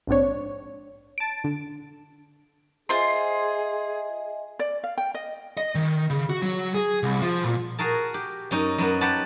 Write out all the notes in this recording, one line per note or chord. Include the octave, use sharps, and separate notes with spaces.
A#1 G#2 C4 D4 C#5
A5 D7
D3
F4 G#4 C5 D#5 E5 G#5 C6
D5
F5
G5
D#5
D#5
D#3
C#3
F#4
F#3
G#4
C2
F3
A#2
F#4 G#4 A#4 A5
G4
F#2 C#4 D#4
F#2 B3 F#5
G4 B4 F#5 A5